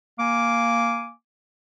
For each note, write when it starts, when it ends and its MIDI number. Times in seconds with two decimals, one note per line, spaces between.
0.19 1.10 58
0.19 1.10 77
0.19 1.10 80
0.19 1.10 86